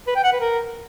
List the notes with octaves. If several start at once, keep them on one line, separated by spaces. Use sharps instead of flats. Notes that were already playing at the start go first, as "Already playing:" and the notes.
B4
G5
F#5
B4
A#4